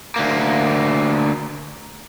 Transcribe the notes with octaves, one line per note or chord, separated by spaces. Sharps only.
D2 A#3